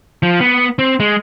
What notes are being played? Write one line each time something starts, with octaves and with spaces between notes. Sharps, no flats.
F3
B3
C4
G#3